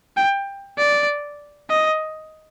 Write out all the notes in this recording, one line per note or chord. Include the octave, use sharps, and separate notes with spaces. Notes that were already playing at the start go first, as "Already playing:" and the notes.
G5
D5
D#5